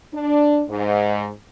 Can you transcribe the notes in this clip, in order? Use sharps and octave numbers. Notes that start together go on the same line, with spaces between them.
D4
G#2